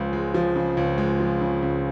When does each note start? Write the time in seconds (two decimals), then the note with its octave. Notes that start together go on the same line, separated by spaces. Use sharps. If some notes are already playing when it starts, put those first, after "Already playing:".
Already playing: C#2 C#3 F3 G#3
0.13 G#3
0.34 F3
0.56 C#3
0.77 C#2
0.98 G#3
1.20 F3
1.41 C#3
1.62 C#2